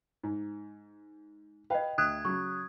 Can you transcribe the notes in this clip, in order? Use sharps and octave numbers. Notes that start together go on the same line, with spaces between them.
G#2
B4 D#5 F5 G5
D2 D#6 F#6 G#6
C#3 F#3 C#6